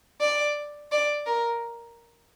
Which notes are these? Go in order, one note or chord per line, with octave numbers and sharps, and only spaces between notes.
D5
D5
A#4